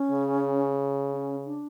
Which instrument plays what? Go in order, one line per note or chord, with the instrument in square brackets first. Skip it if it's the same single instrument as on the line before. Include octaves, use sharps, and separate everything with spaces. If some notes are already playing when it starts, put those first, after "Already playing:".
Already playing: [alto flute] C#4
[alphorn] C#3
[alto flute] C#4
D4